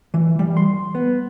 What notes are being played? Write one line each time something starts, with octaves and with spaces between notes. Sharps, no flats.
E3
G3
C6
B3